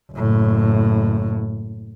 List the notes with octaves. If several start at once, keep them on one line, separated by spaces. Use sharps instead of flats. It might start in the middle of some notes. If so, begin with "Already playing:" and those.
F#1 A2